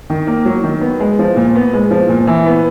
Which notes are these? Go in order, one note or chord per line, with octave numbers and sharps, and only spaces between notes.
D#3
A#3
F#3
D#3
B3
G#3
F3
A#2
B3
G#3
F3
A#2
E3
B3